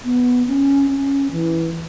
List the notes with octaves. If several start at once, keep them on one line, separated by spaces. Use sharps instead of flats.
B3
C#4
C#4
E3